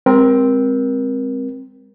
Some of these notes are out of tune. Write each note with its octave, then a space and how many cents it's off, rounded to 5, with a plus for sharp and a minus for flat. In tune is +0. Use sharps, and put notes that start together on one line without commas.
G#3 -35 C4 +0 A#4 +25